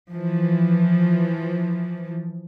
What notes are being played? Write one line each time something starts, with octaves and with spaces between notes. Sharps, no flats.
E3 F3